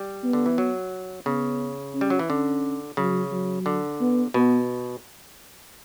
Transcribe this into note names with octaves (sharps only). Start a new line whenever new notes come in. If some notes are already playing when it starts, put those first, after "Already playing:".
Already playing: G3
B3
D3
E3
F#3
C#3 B3
C#4
G3
F#3
E3
D3 C#4
C#3 F#3
F#3
D3
B3
B2 B3